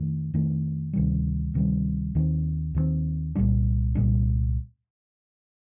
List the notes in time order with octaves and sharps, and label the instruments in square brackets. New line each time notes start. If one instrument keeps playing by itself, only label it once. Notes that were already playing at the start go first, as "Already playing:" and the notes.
Already playing: [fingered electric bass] F2 D#3 A3
F2 D#3 A3
D2 C3 D#3 G3
D2 C3 D#3 G3
D#2 D#3 G3 C4
D#2 D#3 G3 C4
C2 A#2 G3 D4
C2 A#2 G3 D4